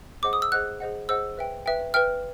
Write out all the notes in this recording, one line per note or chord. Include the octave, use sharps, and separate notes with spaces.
G#4 C5 D#5 F#5 D6
D#6
E6
G#4 C5 D#5 F#5 F#6
G#4 C5 D#5 F#5
G#4 C5 D#5 F#5 E6
B4 E5 G5
B4 E5 G5
B4 E5 G5 F6